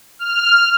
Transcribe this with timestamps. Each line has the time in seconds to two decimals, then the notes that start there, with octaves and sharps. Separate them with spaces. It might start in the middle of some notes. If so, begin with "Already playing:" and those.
0.19 F6